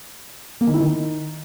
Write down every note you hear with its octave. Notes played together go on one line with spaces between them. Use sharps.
A#3
D#3
E4
D#3